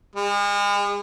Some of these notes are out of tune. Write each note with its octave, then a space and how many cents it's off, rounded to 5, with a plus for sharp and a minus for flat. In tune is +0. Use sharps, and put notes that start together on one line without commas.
G#3 -40